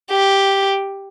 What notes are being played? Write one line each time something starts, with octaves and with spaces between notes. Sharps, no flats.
G4